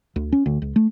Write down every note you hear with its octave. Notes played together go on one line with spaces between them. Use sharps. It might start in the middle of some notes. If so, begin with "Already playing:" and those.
D2
C#4
D2
C#2
A3